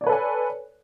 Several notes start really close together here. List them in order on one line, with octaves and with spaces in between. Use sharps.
D5 C#5 B4 A4 G#5